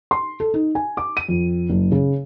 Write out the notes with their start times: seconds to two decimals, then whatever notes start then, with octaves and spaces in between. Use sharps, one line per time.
0.11 C6
0.40 A4
0.54 D#4
0.75 G#5
0.97 D6
1.17 D#7
1.29 F2
1.70 F#1
1.92 C#3